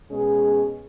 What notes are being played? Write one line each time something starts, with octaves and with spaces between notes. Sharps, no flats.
B2 G#3 C#4 G#4